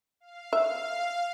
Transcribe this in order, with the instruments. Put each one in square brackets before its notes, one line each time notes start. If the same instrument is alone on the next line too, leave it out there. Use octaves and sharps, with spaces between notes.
[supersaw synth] F5
[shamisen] E5